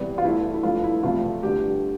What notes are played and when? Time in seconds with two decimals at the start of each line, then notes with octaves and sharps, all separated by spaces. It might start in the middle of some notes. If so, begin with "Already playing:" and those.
Already playing: E2 C3 G3 D5
0.18 F4
0.23 E2 E3 A3 E4
0.54 E4
0.63 G2 F3 A3 F4
0.84 E4
1.03 E2 C3 F3 A3 F4
1.43 G2 D3 A3 G4